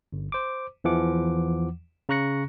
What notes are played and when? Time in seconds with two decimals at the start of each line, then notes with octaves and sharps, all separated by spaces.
0.13 G1
0.32 C5 D6
0.84 E2 E3 F3 F#5 D6
2.09 C#3 A#5 C#6 F#6 A#6 C#7